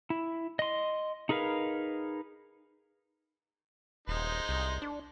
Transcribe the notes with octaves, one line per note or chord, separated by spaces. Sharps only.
E4
D#5 C6
D#4 G#4 A#4 B4 F5
D#1 G#3 D#4 C5
C2
D4